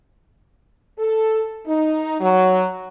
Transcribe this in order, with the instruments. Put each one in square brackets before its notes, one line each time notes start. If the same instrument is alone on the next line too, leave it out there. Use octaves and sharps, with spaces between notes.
[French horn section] A4
D#4
F#3